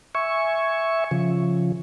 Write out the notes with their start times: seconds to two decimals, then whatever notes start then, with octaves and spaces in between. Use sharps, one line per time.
0.15 E5 G#5 C#6
1.11 C#3 F3